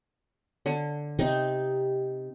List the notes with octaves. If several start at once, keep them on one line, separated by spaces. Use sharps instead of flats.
D3
C3 C4 D#4